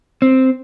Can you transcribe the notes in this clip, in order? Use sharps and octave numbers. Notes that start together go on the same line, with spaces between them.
C4